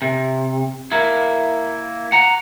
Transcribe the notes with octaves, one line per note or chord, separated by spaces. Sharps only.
C3
A#3 E4
F#5 A#5